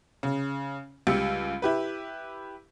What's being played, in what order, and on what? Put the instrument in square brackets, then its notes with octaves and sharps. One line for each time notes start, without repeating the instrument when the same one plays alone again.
[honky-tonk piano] C#3
C#2 G3 G4 E6 C#7
E4 G4 B4